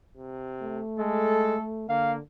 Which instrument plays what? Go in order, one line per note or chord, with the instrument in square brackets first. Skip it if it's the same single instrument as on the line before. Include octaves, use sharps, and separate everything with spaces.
[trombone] C3
[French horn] A3
[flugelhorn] G#3 [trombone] A4
[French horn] D3 [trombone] A#3 [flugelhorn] F5